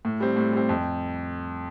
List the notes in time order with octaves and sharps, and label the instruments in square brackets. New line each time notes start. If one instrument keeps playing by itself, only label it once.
[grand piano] A2
G3 C4
A2
G3 C4
F2